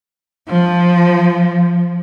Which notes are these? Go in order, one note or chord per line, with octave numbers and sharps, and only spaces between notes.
F3